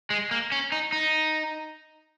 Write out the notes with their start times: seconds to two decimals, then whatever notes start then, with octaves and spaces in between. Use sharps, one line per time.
0.10 G#3
0.31 A#3
0.52 C#4
0.72 D#4
0.92 D#4